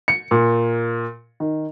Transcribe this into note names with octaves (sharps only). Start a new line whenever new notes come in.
C#7
A#2
D#3